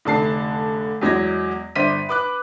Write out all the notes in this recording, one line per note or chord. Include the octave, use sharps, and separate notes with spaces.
F1 D3 A5 C7
E2 F#3 G#3 G#6 A#6
G1 C5 D5 B6 D#7
B4 D6 F#6